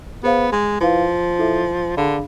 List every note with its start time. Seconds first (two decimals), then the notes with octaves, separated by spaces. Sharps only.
0.23 B3 G#4 C5 F5
0.52 G#3
0.81 F3 E4 B4 F5
1.39 E4 A4 E5
1.97 D3 D4 G#4 D5 F5 B5